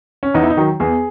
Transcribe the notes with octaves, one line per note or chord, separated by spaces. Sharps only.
C#4
E2 D#4
E4
D#4
D#3 F#3
E2 G#4